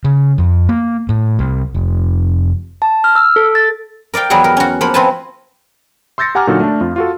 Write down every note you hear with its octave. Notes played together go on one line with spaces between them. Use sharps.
C#3
F2
A#3
A2
C2
F1
A5
F6
E6
A4
A6
A#4 D5 F5 G5
E2 F#3 G3 F#4 G#4 F#5
A#4
C#4 F#4
F3 A#3 F#5 B5
F3 C4 F#4 B4 G#5 A5
C6 E6 G6 A6 A#6 C#7
G4 F#5 G#5 A#5 D6 F6
A#2 D3 F#3 D#4 F#4 A4
A3 D4
F2 F4
F4 F#4 A4